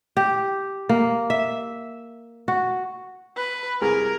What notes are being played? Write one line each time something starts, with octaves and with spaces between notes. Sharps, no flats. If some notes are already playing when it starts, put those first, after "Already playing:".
G4
A#3
E5
F#4
B4
C2 G#4 A#4 F6